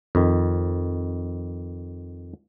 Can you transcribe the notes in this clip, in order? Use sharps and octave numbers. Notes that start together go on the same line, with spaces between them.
F2 D#3